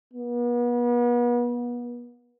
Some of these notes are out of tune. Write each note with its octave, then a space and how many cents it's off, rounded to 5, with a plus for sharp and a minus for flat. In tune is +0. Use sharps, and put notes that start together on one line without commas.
B3 -35